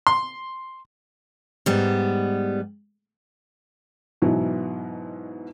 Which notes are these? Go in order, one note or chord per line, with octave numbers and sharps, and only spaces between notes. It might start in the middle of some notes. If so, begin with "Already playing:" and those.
C6
G#2 G3 B3
G#2 B2 E3 F#3